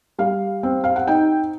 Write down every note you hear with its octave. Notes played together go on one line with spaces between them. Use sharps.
G3 F5
C4
F5
F#5
D#4 G5